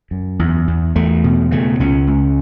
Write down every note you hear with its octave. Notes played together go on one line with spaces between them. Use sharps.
F#2
E2
E2
E2 A3
B2
C#3 A3
C#2 C#4
C#2